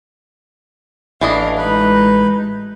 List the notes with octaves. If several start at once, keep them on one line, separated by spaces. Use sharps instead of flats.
A1 E3 D4 D#5 F5
G#3 D#4 B4